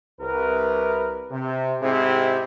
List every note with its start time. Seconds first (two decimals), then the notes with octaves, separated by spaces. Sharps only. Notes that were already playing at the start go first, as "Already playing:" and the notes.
0.21 C2 A#4 B4
1.31 C3
1.82 G#2 C3 C4 E4 G4 G#4